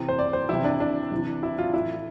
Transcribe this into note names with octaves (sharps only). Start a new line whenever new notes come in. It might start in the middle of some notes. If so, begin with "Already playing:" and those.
Already playing: C3 E3
C5
D5
C5
C3 E3 E4
D4
D4
C3 E3
E4
F4
A2 E3 E4